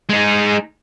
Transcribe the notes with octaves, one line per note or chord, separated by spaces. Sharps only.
G#3 D#4